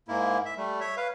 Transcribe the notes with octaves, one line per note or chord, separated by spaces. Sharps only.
G#2 A#3 E4
E5
G3 A3
C#5 E5
B4 F5